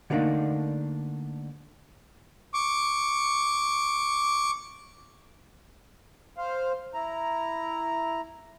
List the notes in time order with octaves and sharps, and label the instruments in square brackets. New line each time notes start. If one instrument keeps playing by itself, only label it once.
[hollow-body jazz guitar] D3 G3 A3 A#3 D4 D#4
[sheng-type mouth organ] C#6 D6
[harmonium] C5 F5
E4 A#5